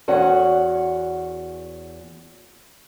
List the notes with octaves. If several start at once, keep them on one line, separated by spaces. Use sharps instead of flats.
E2 C#4 F#4 F#5